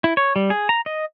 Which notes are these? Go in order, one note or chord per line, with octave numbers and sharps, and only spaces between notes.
E4
C#5
G3
G#4
A#5
D#5